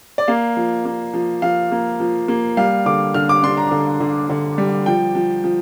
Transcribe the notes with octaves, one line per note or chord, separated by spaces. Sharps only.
D5
A#3 F5
F3
A#3
F3
F3 F5
A#3
F3
A#3
G3 F5
D3 D6
D3 F6
D6
D4 C6
A#5
D3
D3
D3
G3
F3 G5
F3
F3